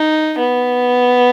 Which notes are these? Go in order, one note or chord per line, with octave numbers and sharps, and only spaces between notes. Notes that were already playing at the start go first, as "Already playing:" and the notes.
Already playing: D#4
B3